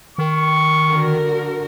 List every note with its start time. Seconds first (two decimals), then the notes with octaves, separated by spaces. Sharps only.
0.18 D#3 C#6
0.89 D3 F#4 A#4